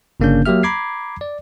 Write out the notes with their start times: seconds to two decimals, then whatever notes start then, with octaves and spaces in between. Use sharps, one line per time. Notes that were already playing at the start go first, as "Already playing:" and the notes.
0.20 G1 C#3 A#3 C#4 D4 G6
0.46 F#3 A#3 G4 E5 F6
0.63 A#5 B5 D6 G#6 C7
1.21 D5